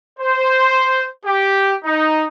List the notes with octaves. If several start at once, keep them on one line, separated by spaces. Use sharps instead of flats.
C5
G4
D#4